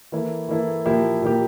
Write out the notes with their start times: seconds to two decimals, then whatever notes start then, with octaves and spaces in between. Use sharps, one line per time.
0.12 E3 A#3 E4 A4
0.49 E3 A#3 E4 A4
0.85 A#2 F3 A#3 E4 G4
1.22 A#2 F3 A#3 E4 G4